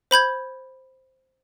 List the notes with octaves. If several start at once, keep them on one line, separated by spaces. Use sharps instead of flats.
C5 B5 G6 G#6